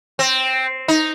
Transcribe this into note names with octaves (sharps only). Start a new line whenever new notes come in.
C4
D#4